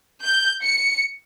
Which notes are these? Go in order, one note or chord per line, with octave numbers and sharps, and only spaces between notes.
G6
C#7